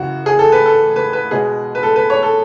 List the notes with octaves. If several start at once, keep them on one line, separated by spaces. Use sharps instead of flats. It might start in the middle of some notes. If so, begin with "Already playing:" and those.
Already playing: F#2 C#3 E3 F#4
G#4
A4
B4
A4
B4
B4
B2 G#3 B3 G#4
B4
A4
B4
C#5
A4